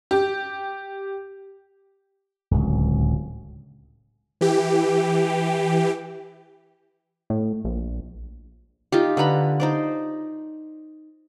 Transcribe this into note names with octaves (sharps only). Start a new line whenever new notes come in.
G4
D1 C#2
E3 G4
A2
A#1
D#4 F4 G4
D3 B4 A#5 B5
D#4 C5 D5